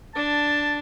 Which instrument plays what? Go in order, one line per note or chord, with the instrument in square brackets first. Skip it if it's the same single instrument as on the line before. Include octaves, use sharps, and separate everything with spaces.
[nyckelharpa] D4 [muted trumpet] A5